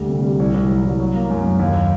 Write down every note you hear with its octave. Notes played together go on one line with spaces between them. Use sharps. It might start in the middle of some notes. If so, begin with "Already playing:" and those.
Already playing: D2 G3
C3
G3
C2
C2
F#3
C2
F#3
A#3
F#2
F#2
D#2